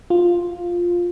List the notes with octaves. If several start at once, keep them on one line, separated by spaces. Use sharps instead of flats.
F4